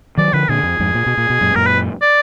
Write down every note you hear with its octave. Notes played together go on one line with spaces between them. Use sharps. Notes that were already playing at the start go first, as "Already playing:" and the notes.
D#3 F#3 D5
D3 F3 B4
A#2 D3 G#4
F2
F2 G#2
A#2
B2
A#2
B2
F#2 A#2
F#2 A#2 A#4
B4
D5